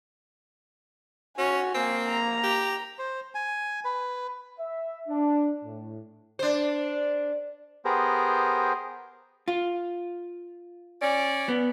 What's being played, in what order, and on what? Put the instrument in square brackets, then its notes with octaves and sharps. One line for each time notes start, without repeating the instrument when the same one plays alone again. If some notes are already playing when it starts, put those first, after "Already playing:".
[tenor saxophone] C#4 [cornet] F#4 [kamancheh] G#5
[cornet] A#3 [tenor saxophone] C4
[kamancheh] A#5
[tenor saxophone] G4
[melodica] C5
G#5
B4
[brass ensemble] E5
D4
A2
[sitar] D4 C5
[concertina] B3 G4 G#4 A#4 C5
[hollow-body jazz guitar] F4
[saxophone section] C#4 D5
[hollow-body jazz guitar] B3